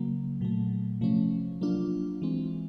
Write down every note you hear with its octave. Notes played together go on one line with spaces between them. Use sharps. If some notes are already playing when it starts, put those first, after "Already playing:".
Already playing: C#3 F#3 A#3
A#2 F#3 A3
C3 F3 A3 C#4
F#3 A#3 D4 F4
E3 G#3 C4